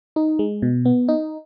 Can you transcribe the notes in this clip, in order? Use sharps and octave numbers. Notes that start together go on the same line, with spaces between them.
D#4
G#3
B2
B3
D#4